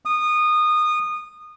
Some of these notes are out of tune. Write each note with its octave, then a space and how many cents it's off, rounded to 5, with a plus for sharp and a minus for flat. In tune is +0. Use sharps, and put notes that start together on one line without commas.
D#6 -20